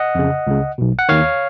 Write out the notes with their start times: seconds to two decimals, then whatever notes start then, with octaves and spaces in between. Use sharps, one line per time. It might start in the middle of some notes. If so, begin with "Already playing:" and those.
Already playing: D#5 F#5
0.15 F2 C#3
0.47 C#2 C#3
0.78 B1 B2
0.99 F#5
1.09 D#2 D#3 C#5 F5